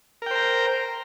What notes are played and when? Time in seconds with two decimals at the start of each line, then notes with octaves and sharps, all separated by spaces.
0.22 A#4
0.26 G5
0.31 C5
0.35 A#5